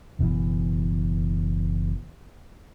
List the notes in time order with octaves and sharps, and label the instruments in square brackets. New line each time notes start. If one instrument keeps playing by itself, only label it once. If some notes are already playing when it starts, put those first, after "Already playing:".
[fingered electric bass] F#1 B2 E3